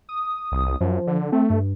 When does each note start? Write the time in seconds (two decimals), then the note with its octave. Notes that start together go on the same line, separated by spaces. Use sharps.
0.09 D#6
0.52 C2
0.81 F#2 F3
1.07 D3
1.32 A3 C4
1.50 G2